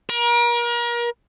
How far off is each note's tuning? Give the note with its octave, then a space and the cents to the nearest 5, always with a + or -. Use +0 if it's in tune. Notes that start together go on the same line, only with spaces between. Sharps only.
A#4 +35